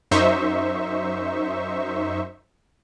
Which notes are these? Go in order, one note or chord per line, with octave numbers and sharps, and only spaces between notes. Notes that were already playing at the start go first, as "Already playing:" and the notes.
F#2 D#4 C5 E5 C#6